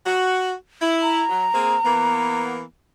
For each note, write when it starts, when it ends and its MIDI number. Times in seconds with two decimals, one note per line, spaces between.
0.05 0.52 66
0.80 1.23 64
1.02 2.41 82
1.29 1.45 54
1.54 1.75 58
1.54 1.75 60
1.54 1.75 68
1.85 2.61 52
1.85 2.61 58
1.85 2.61 59